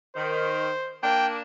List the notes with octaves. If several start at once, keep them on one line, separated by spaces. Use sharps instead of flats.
D#3 C5
A#3 D4 G5